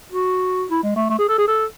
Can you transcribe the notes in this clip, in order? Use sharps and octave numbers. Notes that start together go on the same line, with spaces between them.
F#4
E4
G#3
A3
A3
G#4
A4
G#4
A4